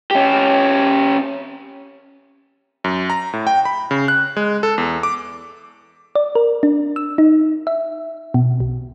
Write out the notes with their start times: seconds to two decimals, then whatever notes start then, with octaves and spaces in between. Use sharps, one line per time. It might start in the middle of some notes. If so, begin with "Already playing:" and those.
0.11 C#4 G4
2.84 F#2
3.10 A#5
3.33 A2
3.47 G5
3.65 B5
3.91 C#3
4.08 F#6
4.37 G#3
4.63 A4
4.78 E2
5.03 D6
6.15 D5
6.35 A#4
6.63 D4
6.96 E6
7.18 D#4
7.67 E5
8.34 B2
8.60 B1